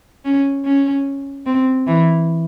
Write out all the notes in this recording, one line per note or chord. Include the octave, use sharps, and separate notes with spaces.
C#4
C#4
C4
E3